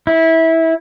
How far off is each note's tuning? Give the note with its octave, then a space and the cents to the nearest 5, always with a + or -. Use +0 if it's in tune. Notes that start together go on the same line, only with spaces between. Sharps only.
E4 -20